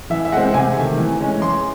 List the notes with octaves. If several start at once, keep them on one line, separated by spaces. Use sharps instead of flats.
E3 E5
E5
G#3 C4 F#5
C3 G#5
D#3 A3
E3
G#3 C#4
E3 C6